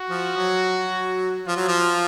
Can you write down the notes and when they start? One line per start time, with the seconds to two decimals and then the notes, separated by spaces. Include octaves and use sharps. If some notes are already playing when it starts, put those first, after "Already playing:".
Already playing: F#4
0.10 F3
0.37 F#3
1.46 F3 F4
1.57 F#3
1.68 F3